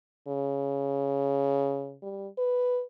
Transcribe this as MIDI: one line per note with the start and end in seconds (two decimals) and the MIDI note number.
0.28 1.96 49
2.03 2.27 55
2.38 2.82 71